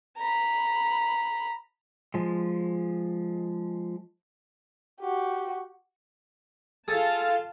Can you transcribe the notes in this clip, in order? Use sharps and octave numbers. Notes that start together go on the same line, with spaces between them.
A#5 B5
F3 G#3
F#4 G4
F4 G#4 A4 F5 A5